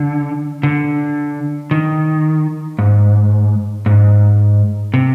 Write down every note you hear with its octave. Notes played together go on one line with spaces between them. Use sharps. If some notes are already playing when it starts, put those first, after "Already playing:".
Already playing: D3
D3
D#3
G#2
G#2
C3